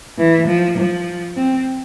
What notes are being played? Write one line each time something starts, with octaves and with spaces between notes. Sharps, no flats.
E3
F3
F3
C4